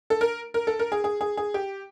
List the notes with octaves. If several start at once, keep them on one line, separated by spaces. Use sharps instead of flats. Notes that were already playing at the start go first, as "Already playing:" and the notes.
A4
A#4
A#4
A4
A#4
G#4
G#4
G#4
G#4
G4